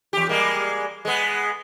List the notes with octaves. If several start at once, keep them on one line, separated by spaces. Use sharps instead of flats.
E2 G4
G3 G#3 A#3
G#3 B3